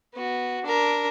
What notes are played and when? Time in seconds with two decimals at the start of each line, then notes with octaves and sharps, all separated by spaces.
0.14 B3 F#4
0.64 D4 A#4